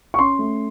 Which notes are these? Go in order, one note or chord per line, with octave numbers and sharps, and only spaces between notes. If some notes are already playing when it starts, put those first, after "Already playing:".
C#6
C#4 C6
A3